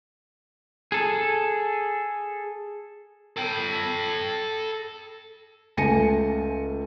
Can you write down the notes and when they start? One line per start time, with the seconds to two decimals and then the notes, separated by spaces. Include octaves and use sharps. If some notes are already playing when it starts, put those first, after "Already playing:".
0.92 G#4 A4
3.37 A4 G5
5.77 C#2 A3 G#5 A#6 C#7 D#7